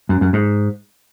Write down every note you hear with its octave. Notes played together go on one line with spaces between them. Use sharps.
F#2
F#2
G#2